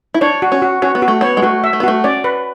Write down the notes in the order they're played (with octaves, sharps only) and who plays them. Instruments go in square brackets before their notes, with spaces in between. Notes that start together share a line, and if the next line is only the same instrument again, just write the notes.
[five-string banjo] E4
[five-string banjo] D4 [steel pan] C#5
[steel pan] F#4
[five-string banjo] C#4
[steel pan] F#4
[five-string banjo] C#4 [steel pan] F#4
[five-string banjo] B3
[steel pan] F#4
[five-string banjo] A3
[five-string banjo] B3 [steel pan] C#5
[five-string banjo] G#3
[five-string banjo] A3 [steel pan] F#4
[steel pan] E5
[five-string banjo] A3
B3
[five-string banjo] A3 [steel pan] F#4
[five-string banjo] C#4 [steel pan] D5
[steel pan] B4